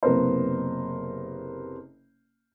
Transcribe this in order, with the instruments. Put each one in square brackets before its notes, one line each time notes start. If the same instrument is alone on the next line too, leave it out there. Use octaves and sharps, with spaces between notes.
[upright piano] F#1 C3 B3 A#4 C5